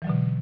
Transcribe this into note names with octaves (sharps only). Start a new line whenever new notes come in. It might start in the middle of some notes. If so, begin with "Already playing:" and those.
B2 D3 E3 F#3